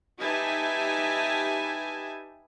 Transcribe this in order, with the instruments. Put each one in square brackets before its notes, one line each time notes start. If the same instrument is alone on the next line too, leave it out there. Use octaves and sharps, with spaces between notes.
[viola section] D#4 G4 B4 E5 G#5 A5